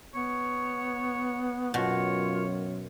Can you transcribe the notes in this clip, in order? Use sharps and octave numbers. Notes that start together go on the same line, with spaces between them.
B3 C#5
F#2 B2 F4 C#5